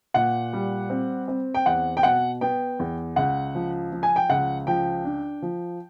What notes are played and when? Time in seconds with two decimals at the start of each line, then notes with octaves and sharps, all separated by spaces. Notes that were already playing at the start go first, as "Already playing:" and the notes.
0.14 A#2 F#5
0.53 G3
0.90 C4
1.28 C4
1.54 G5
1.66 E2 F#5
1.97 G5
2.03 B2 F#5
2.41 B3 G5
2.79 E2
3.16 C#2 F#5
3.55 F3
3.92 F3
4.03 G#5
4.16 G5
4.30 C#2 F#5
4.67 F3 G5
5.05 D4
5.42 F3